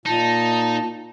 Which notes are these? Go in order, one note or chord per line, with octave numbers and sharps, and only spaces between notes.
A#2 D#4 A5